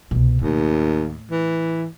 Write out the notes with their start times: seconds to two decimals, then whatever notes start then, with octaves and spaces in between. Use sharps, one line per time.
0.11 C2 B2
0.42 D#2 A2
1.31 E3